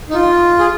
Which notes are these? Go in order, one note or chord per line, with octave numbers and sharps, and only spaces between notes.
D#4
F4
G#4